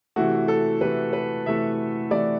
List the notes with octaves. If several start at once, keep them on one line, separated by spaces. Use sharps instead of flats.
C3 E3 A3 F#4
A4
C3 E3 A3 B4
B4
C3 E3 A3 E5
C3 E3 A3 D5